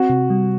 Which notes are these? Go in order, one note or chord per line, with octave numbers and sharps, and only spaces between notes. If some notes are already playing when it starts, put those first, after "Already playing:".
Already playing: C4 F#4
C3
G3